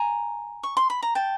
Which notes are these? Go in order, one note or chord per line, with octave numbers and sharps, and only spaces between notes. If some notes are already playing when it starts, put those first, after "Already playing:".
Already playing: G#5 A#5
C#6
C6
B5
A#5
G5 A5